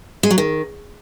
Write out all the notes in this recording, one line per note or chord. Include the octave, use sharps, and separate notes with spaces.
G#3
F#3
D#3